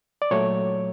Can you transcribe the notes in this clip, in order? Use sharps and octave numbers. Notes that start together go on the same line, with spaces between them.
D5
A#2 F#3 A3 C#5